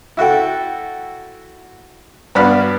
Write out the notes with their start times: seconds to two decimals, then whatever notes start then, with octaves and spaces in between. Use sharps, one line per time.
0.17 E4 F#4 A4 G5
2.35 G2 B3 F#4 D5 B5 F6